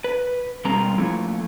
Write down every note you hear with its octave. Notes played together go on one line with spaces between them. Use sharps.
B4
B2 G3 G#3 A#3 C4 A#5
F3 A3 A#3 E4